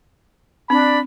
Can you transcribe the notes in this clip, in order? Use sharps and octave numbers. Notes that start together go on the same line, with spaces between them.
C4 D4 B5